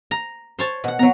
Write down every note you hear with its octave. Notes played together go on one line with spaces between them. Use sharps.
A#5
C5 C#5 A5
B2 F#5
F#3 B3 A#5